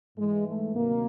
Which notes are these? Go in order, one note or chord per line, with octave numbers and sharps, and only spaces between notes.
G#2 E3 G#3
A3
D2 C3 D#3 F#3 A#3